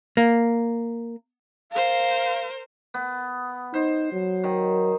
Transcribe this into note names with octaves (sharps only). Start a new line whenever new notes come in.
A#3
A#4 C5 F5
B3
D#4 C5
F#3
D#3